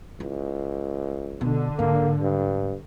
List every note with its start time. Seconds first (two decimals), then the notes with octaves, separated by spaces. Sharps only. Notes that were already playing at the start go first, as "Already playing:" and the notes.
0.20 C#2 E4
1.41 B2 D3
1.79 G#2 A#3
2.21 G2